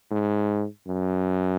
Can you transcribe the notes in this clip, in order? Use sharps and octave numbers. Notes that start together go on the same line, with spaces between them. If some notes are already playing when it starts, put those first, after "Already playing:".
G#2
F#2